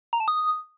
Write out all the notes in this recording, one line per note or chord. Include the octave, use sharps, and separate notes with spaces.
A#5
A5
D#6